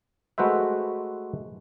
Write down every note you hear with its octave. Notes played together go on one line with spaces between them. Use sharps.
G#3 A3 F#4 B4 C5 E5